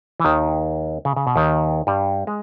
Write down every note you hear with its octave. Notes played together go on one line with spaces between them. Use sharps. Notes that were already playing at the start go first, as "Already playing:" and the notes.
E3
D#2 D#3
C#3
C#3
B2
D#2 D#3
G2 G3
G#3